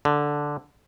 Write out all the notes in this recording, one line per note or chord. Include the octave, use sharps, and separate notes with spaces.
D3